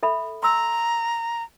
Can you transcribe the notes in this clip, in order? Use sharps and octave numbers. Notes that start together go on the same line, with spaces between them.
A4 E5 B5
A#5 C6 E6